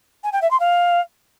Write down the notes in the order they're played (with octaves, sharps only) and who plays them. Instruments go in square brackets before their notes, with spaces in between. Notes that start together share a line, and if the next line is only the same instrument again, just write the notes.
[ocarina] G#5
G5
E5
C6
F5